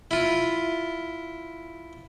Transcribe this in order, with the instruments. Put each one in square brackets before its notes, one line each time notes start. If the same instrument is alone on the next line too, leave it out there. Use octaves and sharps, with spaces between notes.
[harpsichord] E4 F4